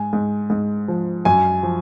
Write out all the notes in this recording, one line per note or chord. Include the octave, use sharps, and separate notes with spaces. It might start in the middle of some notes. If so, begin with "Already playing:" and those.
Already playing: G#2 G#5
G#2
G#2
F3
F#2 G#5
F3